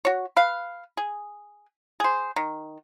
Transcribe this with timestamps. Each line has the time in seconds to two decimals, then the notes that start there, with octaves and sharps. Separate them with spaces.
0.05 F#4 C#5
0.36 B4 F5
0.97 G#4
2.00 G#4 C5
2.36 D#3